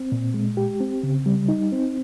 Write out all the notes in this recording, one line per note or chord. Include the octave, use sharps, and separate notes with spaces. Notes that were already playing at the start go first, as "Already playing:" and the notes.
Already playing: C4
A#2
G#3
G4
C4
C#3
G3
D#4
C4